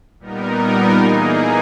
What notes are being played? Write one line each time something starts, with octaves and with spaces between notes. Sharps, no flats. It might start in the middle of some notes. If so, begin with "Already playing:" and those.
A#2 G3 B3 D#4 A#4
E3 A#3 D#4 G#4